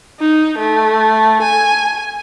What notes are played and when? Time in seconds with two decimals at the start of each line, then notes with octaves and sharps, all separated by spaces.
0.20 D#4
0.58 A3
1.42 G#5